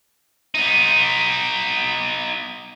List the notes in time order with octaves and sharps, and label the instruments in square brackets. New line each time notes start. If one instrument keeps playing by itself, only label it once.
[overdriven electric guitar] B3 D#4